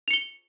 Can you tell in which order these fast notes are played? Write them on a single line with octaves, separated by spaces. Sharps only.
F7 C#7 G7